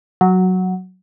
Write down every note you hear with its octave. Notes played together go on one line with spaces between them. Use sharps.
F#3